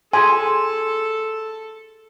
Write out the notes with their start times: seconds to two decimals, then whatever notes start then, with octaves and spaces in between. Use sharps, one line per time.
0.13 F4 G#4 A4 G#5 C6